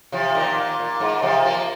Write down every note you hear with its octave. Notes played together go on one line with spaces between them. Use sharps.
C3 F3
A#2 D#3
A#2
A#2
G#2
C3 F3
F3 A#3